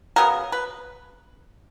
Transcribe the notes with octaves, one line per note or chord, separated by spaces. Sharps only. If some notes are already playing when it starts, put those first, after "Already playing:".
C#3 F#3 B3 A#4
B4